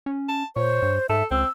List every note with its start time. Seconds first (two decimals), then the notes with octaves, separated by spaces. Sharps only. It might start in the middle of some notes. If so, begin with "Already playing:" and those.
0.06 C#4
0.29 A5
0.56 A#2 C5 C#5
0.82 G2
1.09 G#2 A4 E5
1.31 C#2 C4 E6